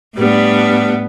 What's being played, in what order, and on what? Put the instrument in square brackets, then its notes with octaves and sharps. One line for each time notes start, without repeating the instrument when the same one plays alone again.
[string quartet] A2 G3 B3 D4